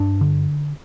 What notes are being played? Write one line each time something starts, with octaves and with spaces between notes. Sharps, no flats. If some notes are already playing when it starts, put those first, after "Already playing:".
Already playing: G2 D4
D3